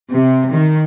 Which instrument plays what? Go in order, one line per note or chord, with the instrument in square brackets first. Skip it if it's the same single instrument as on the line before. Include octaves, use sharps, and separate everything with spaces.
[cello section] C3
D#3